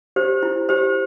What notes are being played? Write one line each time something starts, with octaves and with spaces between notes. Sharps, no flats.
G4 C5
E4
G4 C5